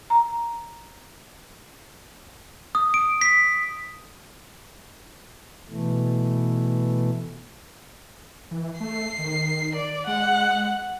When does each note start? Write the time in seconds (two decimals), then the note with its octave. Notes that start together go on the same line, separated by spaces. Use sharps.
0.10 A#5
2.75 D#6
2.94 D7
3.21 B6
5.69 B2 E3 A3
8.51 E3
8.80 A3 C7
9.18 D#3
9.76 D5
10.07 G#3 F#5